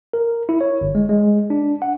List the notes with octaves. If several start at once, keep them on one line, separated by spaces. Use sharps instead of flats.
A#4
E4
C#5
G1
G#3
G#3
D4
F#5